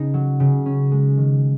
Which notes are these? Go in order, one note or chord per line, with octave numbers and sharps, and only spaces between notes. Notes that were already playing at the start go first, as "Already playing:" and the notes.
Already playing: C#3 B3 D#4
F#3
C#3
C#4
G#3
D#3